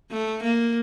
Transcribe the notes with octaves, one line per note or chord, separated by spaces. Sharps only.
A3
A#3